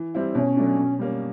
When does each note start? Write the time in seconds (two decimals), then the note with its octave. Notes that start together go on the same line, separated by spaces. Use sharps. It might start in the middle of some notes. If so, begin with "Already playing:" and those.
Already playing: E3
0.14 G3 C4 E4
0.35 B2 C#4
0.57 F#3 A3 D4
0.78 B2
0.99 G3 A#3 C#4